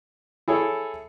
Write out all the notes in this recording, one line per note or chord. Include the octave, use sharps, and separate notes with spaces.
E4 G#4 A4 C#5